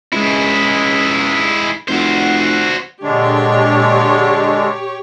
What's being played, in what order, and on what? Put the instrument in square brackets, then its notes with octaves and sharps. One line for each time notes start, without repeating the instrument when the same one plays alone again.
[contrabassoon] C#2 [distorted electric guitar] G#3 E4
[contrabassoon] F1 [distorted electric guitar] F#4 C5
[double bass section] A#2 [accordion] D3 G#3 D4 [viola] G4 C#5